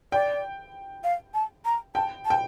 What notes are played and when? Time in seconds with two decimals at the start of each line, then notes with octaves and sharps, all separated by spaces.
0.12 D5 G5
1.04 F5
1.34 A5
1.65 A#5
1.95 G5 A5
2.25 A5
2.30 G5